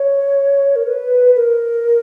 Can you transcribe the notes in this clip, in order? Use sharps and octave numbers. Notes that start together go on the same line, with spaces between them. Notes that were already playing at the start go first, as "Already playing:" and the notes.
Already playing: C#5
A#4
B4
A#4